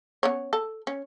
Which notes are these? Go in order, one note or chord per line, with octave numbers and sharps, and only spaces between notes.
B3 C#4 C#5
A4
C#4